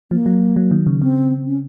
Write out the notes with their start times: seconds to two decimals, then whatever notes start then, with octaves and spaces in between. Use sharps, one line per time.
0.11 F3 A#3
0.26 F#3
0.56 F#3
0.71 D#3
0.87 C#3
1.01 C#3 C4
1.46 C#4